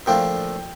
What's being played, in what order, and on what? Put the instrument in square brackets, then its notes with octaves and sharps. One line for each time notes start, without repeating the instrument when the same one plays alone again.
[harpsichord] A#2 F3 A3 D4 F4 [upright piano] G5